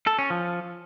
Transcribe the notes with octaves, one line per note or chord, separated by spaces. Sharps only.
A4
C#4
F3